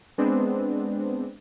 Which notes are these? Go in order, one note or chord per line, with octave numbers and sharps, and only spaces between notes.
G#3 B3 C4 D4